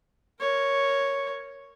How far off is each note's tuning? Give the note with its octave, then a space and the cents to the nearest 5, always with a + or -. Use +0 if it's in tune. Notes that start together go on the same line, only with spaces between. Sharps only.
A#4 +0 C#5 +0